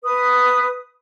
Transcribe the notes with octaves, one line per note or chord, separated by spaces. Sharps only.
B4 D#6